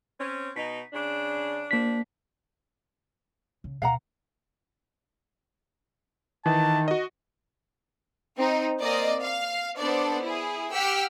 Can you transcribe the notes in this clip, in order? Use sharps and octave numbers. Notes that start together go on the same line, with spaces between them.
C4 C#4
B2 D#4 B6
C#3 D4
F3 A#3 D4 B6
C#3
D2 B2 F5 F#5 A#5
D#3 E3 A5
F#4 D#5
C4 D#4
A#3 C4 D5 D#5
F5
B3 D4 A4 C5 D5
E4 G#4
G4 F#5 G5 E6 F6 B6